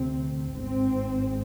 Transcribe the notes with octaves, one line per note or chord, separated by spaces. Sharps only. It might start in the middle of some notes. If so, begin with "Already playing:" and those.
Already playing: D2 C3 C4
G#1 G#2 C4